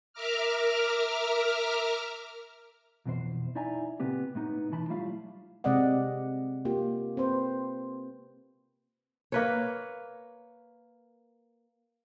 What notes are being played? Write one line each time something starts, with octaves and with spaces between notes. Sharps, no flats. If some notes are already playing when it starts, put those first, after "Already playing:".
A#4 E5 A#5 D6 F6
B1 F2 B2 E3 C5
D#4 E4 D5 E5 G#5 A#5
A#2 C#3 B3 C4 G4
A2 B3 D#4
B1 E3 D#4 A5 B5
F#3 G3 A3 E4 F4 F5
C3 G#3 C4 D5 D#5 F#5
A#3 F4 G4
C4 B4 C5
A#3 B4 C#5